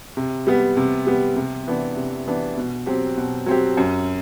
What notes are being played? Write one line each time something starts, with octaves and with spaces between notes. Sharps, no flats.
C3
G3 B3
C3
G3 B3
C3
E3 B3 D4
C3
E3 B3 D4
B2
F#3 C4 G4
B2
F#3 C4 G4
F#2